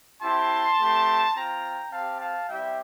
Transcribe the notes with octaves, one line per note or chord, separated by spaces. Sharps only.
C4 E4 G4 A5 C6
A3 C4 G4
C4 F4 G5 A#5
C4 G4 F5 A5
F5 A5
G3 C4 E4 G4 E5 G5